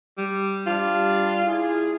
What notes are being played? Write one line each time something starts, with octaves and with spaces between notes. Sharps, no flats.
G3
G3 D4 F4
E4 G#4